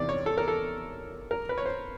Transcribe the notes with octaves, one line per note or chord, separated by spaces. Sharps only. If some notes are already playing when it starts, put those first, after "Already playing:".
Already playing: E2 C3 D#3 D5
C#5
A4
A#4
A4
A#4
B4
C#5
C5